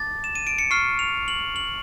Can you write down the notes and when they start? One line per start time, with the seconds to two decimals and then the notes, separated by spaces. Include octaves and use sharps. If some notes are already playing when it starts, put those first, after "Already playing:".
Already playing: A5 D6 A6
0.24 E7
0.35 D#7
0.47 D7
0.59 C#7
0.71 C#6 F6 C7
0.99 F7
1.28 F#7
1.56 F#7